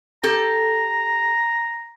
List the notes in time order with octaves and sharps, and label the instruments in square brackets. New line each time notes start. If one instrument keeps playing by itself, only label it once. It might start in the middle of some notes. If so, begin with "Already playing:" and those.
[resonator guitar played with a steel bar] G4 A4 [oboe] A#5